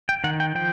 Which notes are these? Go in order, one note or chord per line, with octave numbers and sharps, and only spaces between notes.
G5
D#3 F#5
G5
F3 G5